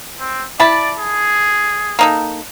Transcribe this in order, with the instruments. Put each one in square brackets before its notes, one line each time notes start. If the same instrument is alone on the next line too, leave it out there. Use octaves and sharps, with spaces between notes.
[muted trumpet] C4
[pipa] E4 A5 B5 [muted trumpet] D5
[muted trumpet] G#4
[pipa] A#3 D#4 A4